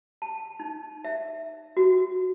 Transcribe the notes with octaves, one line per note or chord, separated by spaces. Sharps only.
A5
D#4
E5
F#4